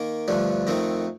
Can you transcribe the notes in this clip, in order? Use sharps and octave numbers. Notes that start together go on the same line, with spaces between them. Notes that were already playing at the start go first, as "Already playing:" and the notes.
Already playing: D#3 A#3
G2 D3 F3 A3 D4
F2 D#3 A3 C4 D#4